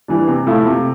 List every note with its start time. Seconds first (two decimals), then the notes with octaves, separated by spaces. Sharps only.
0.08 E3 G3 D4
0.28 C3
0.47 F3 A3 E4
0.65 C3